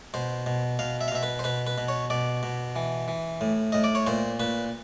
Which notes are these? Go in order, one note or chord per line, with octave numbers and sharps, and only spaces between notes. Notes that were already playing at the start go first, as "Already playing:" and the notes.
B2 C5
B2
B2 F5
E5
F5
B2 E5
B4
C5
B2 B4
B4
B2
C#5
B2 D5
B2
E3
E3
A2
A2 D#5
D5
C#5
A#2 C5
A#2 B4